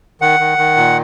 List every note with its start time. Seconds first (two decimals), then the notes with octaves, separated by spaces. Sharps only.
0.21 D#3 F#5
0.40 D#3
0.58 D#3
0.77 A#2